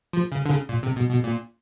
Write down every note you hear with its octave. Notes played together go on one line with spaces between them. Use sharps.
F3
C#3
D3
C#3
A#2
C3
B2
B2
A#2